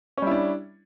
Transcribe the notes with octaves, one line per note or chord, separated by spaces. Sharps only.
G3 C#4 D4 E4